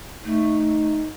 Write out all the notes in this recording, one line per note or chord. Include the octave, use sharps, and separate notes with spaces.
A3 D#4